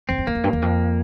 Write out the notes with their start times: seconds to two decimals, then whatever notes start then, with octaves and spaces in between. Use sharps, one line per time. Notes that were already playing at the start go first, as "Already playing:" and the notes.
0.09 E2 C4
0.18 F2
0.27 E2 A#3
0.35 F2
0.44 G2
0.53 E2
0.62 F2